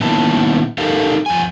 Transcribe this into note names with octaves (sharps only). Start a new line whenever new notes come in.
A#2 D#3 B3 C#4 E4 A5
D#4 G4 A4 A#4 F5
F2 G#5